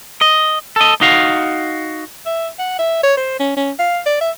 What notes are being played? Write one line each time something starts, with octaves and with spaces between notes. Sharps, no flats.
D#5
A4 D#5
D#4 F#4 F5
E5
F#5
E5
C#5
C5
C#4
C#4
F5
D5
E5